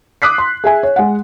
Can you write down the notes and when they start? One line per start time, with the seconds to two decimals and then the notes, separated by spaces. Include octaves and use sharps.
0.22 D6 D#6 F#6 B6 C7
0.38 C6
0.64 G#4 E5 G#5
0.83 C#5
0.96 G#3 F#5